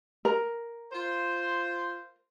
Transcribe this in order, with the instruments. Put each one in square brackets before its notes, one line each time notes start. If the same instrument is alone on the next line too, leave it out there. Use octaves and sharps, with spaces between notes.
[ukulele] A#4
[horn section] F4 C5